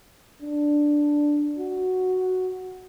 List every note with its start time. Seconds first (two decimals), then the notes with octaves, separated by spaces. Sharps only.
0.42 D4
1.58 F#4